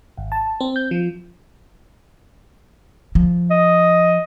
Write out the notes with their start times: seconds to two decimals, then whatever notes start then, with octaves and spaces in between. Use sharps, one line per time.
0.17 G#1
0.32 A5
0.60 C4
0.76 G6
0.91 F3
3.15 F3
3.50 D#5